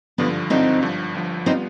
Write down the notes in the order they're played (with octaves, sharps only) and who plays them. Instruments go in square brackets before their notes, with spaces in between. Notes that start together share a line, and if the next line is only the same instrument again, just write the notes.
[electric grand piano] G#1 G2 D3 F3 [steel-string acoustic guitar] B3 D4
[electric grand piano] G#1 G2 D3 F3 [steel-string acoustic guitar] C4 D#4
[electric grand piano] G1 G2 F3
G1 G2 F3
[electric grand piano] G3 B3 F4 [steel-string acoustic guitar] C4 D#4